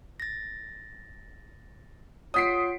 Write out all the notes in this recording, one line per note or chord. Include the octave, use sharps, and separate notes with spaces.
A6 A#6
F4 C#5 F#5 D#6 B6 C7 D7